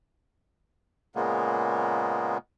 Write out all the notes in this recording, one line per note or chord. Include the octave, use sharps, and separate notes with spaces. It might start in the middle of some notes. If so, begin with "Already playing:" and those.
A#2 C#3 G#3 A#3 B3